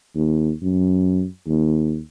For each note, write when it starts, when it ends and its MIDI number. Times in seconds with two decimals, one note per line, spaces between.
0.15 0.51 39
0.63 1.25 42
1.47 1.99 39